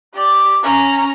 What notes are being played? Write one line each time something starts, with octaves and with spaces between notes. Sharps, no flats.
G4 D5
C#4 A#5